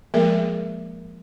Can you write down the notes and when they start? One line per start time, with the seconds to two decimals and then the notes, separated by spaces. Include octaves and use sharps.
0.14 F3 G#3 A#3 G#4 A#4 E5